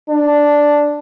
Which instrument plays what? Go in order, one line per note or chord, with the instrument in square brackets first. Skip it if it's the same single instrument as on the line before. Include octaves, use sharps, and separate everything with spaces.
[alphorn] D4